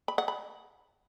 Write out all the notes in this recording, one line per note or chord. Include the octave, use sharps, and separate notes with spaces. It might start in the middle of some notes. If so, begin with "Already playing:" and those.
B5
F#5
B5